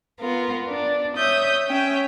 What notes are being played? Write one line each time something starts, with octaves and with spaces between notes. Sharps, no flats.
B3 F4 A#4
D4
C#5 E5 D#6 G6
C#4 E5 G5